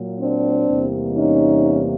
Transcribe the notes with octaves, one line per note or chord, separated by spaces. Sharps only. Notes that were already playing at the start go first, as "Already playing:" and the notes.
Already playing: A#2 F#3 A#3
C4 D4
E2 C3 E3 G3 A#3
C#4 D#4